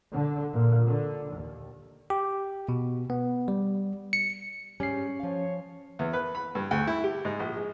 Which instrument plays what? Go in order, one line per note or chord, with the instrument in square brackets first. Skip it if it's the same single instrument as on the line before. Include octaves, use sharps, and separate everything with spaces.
[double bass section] D3
A#2
D3
D#2
[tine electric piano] G4
B2
B3
G3
C#7
[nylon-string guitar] G#2 G3 [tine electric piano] C#4 C7
[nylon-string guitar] F3 F5 [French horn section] C#5
[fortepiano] E2
B4
B5
G2
D2
E4
G4
G#2
A#1
G#3